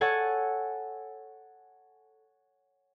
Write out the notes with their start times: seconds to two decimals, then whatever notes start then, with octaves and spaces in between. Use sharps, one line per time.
0.01 A4 C#5 F#5 G#5